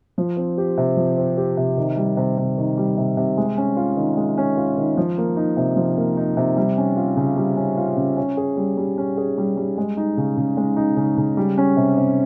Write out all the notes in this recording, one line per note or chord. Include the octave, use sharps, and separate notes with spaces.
F3
C4
G4
C3
F3
C4
G4
C3
D#3
G3
C3
C3
D#3
G3
C3
C3
G#3
C#4
F4
D#3
G#3
C#4
F4
D#3
F3
A#3
D#4
C3
F3
A#3
D#4
C3
G3
C#4
F4
C#3
G3
C#4
F4
C#3
C#4
G#4
G3
G3
C#4
G#4
G3
G3
G#3
D#4
C#3
C#3
G#3
D#4
C#3
C#3
G3
C#4
C3
C3